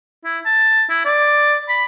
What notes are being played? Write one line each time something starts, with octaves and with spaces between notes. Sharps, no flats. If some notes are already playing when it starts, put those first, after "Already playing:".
E4
A5
E4
D5
B5